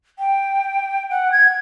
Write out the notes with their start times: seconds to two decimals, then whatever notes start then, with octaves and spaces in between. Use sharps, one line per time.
0.19 G5
1.10 F#5
1.32 G#6